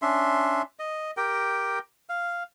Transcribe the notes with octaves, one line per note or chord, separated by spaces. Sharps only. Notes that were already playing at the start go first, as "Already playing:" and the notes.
C#4 D4 E5 C6
D#5
G4 A#4 G5
F5